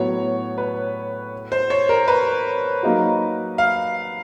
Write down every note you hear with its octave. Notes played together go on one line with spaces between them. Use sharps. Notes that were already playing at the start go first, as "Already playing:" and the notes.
Already playing: A2 F#3 B3 C#5
B4
C5
C#5
A#4
B4
F#3 A#3 D#4 F#4
F5